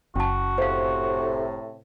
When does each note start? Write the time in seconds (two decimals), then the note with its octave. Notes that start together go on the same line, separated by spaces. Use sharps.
0.16 F#1 C#4 F#4 A5
0.58 A2 C3 C5 F5